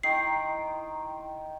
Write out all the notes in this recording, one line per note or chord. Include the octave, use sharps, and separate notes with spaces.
D#3 D#4 E4 G5 A#5 C6 C7